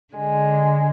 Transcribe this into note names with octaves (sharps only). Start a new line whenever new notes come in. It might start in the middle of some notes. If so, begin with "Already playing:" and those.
D3 G#3